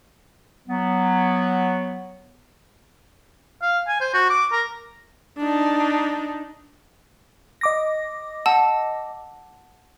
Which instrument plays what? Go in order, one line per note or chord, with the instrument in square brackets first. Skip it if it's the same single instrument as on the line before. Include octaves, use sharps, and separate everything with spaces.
[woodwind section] F#3 B3
[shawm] F5
G#5
C5
F#4
D6
A#4
[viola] D4 D#4
[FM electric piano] D#5 D6 A#6
[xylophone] F#5 A5 E6